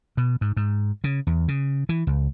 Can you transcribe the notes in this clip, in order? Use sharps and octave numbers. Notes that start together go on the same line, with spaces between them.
B2
G#2
G#2
C#3
E2
C#3
E3
C#2